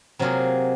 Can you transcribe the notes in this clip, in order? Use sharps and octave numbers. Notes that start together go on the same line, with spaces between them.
C3 F#3 A#3 F4 G#4